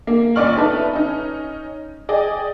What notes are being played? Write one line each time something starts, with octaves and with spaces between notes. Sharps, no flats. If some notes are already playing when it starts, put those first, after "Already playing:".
A#3
A#1 C#4 D5 C#6 F6 F#7
B3 D#4 A4 B4 E5
C#4 D#4
G#4 D5 D#5 G5